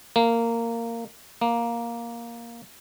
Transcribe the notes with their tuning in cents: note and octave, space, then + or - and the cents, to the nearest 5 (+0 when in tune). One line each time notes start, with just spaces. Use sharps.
A#3 -15
A#3 +5